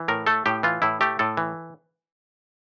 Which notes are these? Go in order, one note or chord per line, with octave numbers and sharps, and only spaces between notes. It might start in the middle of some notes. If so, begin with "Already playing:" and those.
Already playing: E3
A2 A#4
A3 A4
A2 G4
E3 F4
A2 E4
A3 G4
A2 A4
E3